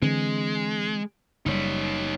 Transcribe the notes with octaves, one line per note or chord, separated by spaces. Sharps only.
D3 E3 G#3 C4
F#1 G3 D#4 C#5